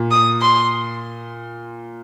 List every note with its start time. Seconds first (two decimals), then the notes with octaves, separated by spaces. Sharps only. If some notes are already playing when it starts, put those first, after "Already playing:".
Already playing: A#2
0.11 D#6
0.41 C6